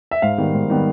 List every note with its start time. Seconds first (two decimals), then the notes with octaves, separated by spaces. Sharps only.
0.11 E5
0.22 G#2 F5
0.38 D#3 G3 B3
0.54 G#2
0.70 D#3 G3 B3